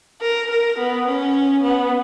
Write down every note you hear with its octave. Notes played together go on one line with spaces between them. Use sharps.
A#4
A#4
B3
C#4
B3